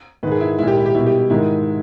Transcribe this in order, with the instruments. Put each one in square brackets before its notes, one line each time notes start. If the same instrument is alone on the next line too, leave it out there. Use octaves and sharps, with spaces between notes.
[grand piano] G#2 D#3 G#3 B4
G#4
E4
A#2 G#3 E4
G4
E4
G4
B2 G3 E4
G4
E4
G#2 D#3 G#3 E4